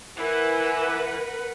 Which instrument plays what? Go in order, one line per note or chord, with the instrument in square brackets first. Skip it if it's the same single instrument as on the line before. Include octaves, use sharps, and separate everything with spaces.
[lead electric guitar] E3 [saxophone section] E4 [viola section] A#4 B4 F#5